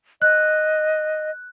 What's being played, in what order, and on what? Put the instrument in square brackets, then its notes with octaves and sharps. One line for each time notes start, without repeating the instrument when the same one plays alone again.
[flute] D#5 [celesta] F#6